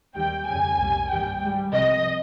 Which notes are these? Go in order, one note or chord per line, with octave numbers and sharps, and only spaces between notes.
D#2 D#3 G3 G5
F2 C#3 G3 G#5
C2 A#2 G3
G2 D#3 G3 G5
G#2 G3
C2 C3 F3 D#5